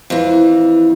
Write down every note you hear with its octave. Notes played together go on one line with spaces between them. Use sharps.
F2 E3